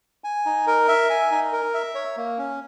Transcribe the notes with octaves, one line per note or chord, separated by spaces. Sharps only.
G#5
D#4
A#4
E5
G#5
D#4
A#4
E5
C#5
A#3
C#4